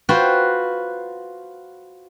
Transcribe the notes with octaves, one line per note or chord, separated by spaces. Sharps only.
F4 F#4 B4 C5 G5